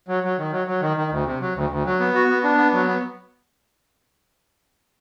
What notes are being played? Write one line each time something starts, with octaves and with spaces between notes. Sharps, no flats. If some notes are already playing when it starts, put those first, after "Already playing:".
F#3
F#3
D#3
F#3
F#3
D#3
D#3
D2
C3
F#3
D2
D2
F#3
B3
F#4
B3
D4
B3
F#3
B3